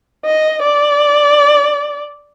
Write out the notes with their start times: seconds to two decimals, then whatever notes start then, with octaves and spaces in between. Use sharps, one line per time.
0.25 D#5
0.63 D5